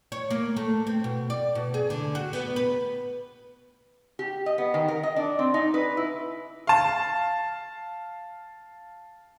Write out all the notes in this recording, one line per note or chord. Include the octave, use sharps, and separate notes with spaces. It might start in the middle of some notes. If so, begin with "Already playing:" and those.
C#5
A#3
A3
C4
B2
D5
B2
G#4
D3
F#4
B3
B4
G4
D#5
B3
D#3
A#4
D#5
D4
C4
D#4
B4
E4
F5 A5